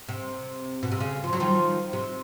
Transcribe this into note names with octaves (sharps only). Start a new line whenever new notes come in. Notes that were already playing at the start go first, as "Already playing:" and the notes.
C3
B2
C3
C#3
F3
F#3
D#3 F3
C3